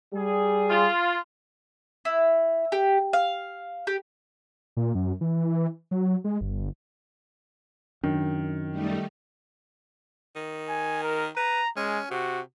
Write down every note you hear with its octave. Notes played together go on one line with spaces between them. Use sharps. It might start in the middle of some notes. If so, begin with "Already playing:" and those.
G3 G#4
F4
E4
G4
F5
G4
A#2
F#2
E3
F#3
G#3
G1
F#2 D#3 D4
G3 A3 D#4
D#3
G#5
A#4
B4 A#5
G#3 C#4
C3 F#4